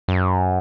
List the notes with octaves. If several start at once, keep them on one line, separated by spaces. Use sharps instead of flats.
F#2